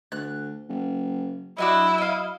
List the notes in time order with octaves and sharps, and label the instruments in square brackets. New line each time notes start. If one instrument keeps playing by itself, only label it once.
[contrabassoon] D2 [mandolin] F#6
[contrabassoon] F#1
[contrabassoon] F#3 [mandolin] D4 F#4 D#5 [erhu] E4
[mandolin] D#5 F5